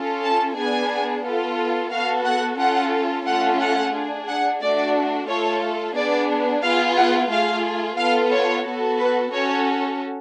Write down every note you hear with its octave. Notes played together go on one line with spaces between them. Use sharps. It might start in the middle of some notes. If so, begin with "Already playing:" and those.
Already playing: C#4 F4 A4
A5
B3 D4 G#4 G#5
B3 F4 A4
B3 F#4 A4 F5
F#5
C#4 F4 A4 F#5
A3 C#4 F4 A4 F#5
F#5
D4 G#4
F#5
A3 D4 F#4 D5
A3 F4 A4 C#5
B3 D4 G#4 D5
B3 F4 G#4 F5
F#5
A3 F4 G#4 F5
B3 F4 A4 F5
C#5
B3 F#4 A4
B4
C#4 F#4 A4 C#5